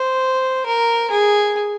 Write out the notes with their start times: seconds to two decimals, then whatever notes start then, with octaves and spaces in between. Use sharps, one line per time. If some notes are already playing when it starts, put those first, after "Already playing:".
Already playing: C5
0.66 A#4
1.11 G#4